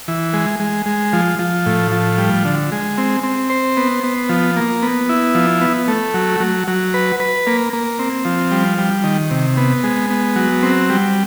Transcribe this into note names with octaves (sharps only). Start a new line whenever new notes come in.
E3
G#3
G#3
G#3
F3
F3
A2
F3
G3
D3
G#3
C4
C4
C5
B3
B3
F3
A#3
B3
E4
F3
B3
A3
F#3
F#3
F#3
B4
B4
A#3
A#3
C4
F3
G3
G3
D#3
C3
B3
G#3
B3
F#3
C4
G3